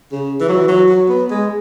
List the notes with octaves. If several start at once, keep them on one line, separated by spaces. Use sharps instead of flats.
C#3
E3
F#3
E3
F#3
F#3
B3
G#3